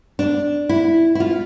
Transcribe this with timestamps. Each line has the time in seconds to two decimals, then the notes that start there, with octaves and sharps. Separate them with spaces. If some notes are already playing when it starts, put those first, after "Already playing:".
0.19 D4
0.69 E4
1.15 E4
1.20 F4